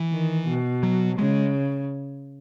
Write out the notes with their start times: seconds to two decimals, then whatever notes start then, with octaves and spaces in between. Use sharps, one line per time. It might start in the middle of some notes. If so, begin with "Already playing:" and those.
Already playing: E3
0.12 D#3
0.47 B2
0.83 F#3
1.18 C#3 G#3